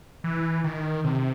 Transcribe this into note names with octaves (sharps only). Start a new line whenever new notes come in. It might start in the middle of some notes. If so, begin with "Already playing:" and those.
E3
D#3
C3